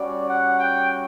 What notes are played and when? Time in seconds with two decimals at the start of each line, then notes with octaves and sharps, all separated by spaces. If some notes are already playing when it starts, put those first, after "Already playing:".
Already playing: G3 C#4 F#4 D5
0.29 F#5
0.58 G5